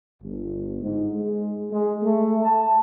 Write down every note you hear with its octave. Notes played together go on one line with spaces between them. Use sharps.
G1
G#2
G#3
G#3
A3
A5